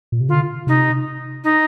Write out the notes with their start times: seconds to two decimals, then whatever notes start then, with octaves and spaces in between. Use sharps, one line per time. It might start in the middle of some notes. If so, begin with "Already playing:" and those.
0.12 A#2
0.21 C3
0.28 D3 F4
0.67 C3 D#4
1.44 D#4